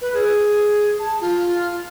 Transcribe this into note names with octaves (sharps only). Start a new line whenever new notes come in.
B4
G#4
A5
F4